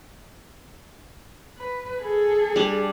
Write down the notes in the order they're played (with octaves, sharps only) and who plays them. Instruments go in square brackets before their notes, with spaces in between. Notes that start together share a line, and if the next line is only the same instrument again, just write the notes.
[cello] B4
G#4 A4
[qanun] G3 D4